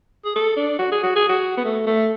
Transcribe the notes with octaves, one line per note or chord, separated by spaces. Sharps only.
G#4
A4
D4
F#4
G#4
F#4
G#4
F#4
B3
A3
A3